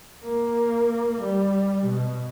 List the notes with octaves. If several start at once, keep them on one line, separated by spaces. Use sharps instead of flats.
A#3
G3
B2